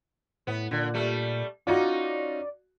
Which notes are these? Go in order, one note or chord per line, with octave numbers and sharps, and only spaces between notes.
A2 B3
A#2 D3
G3 A3
C#4 D#4 F4 F#4 D5